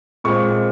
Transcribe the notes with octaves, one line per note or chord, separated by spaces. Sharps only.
A#2 G#3 C4 C#6